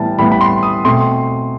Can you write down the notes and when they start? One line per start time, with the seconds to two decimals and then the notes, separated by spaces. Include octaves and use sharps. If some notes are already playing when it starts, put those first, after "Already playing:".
Already playing: A2 E3 G3 B3 A5
0.18 A2 E3 G3 B3 B5
0.32 B5
0.41 C6
0.63 D#6
0.85 B2 A3 C4 C6